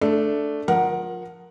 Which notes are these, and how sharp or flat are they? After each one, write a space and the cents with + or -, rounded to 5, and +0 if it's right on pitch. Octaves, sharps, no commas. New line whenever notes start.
A3 +0 D4 +0 A4 +0
F3 +30 A#4 +15 F#5 +0